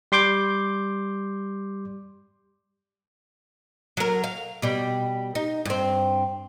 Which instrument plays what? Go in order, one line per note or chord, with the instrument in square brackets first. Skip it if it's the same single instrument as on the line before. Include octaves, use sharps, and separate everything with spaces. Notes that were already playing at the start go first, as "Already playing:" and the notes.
[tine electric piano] G3 C6 D6 G6
[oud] F#3 A#4
F5
B2 G3
D#4
G2 C4